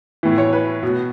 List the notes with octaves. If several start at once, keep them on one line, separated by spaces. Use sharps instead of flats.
A2 E3
C#5
B4
B2